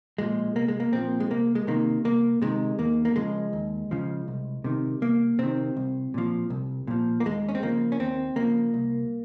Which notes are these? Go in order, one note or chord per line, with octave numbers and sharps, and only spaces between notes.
A#2 F3 G#3
C2 A#3
G#3
A#3
A#2 F3 C4
G#3
C2 A#3
G#3
C3 D#3 A#3
C2 A#3
C3 D#3 G#3
D#2 A#3
A#3
C#3 F3 G#3
D#2
C#3 F3
C2
C3 D#3
C2 A#3
C3 D#3 C4
C2
A#2 F3
C2
A#2 F3
A#3
D#2 G#3
C#4
C4
C#3 F3 A#3
C#4
D#2 C4
C#3 F3 A#3
C2